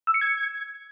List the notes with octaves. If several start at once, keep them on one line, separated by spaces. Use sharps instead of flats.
E6
C#7
G#6